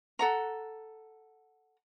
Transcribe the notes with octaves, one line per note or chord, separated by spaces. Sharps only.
A4 F#5 A#5